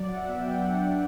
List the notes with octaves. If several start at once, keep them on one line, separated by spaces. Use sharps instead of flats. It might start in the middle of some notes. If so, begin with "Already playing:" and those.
Already playing: F#3 D5
F#5
E5
B3
G5
D4 F#5